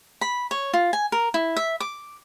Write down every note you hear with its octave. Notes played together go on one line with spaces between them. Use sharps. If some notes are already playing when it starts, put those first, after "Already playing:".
B5
C#5
F4
G#5
A#4
E4
E5
D6